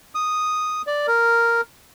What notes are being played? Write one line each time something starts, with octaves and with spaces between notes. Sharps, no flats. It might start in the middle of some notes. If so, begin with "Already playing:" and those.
D#6
D5
A#4